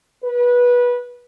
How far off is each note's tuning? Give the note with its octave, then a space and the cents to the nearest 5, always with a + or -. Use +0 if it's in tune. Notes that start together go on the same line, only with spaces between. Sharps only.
B4 -20